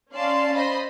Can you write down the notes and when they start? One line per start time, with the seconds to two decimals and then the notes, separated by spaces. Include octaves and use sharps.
0.12 C#4 D5 F5 A5 C6
0.54 C5 D#5 B5